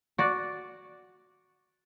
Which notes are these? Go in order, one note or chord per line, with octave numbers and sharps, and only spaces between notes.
F#4 D5